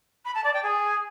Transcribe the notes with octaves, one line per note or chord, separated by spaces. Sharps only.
B5
A5
D5
G5
G#4